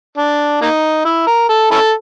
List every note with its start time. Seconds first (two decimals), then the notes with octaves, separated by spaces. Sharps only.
0.17 D4
0.61 A#3 D#4
1.05 E4
1.27 A#4
1.49 A4
1.71 C#4 E4 A4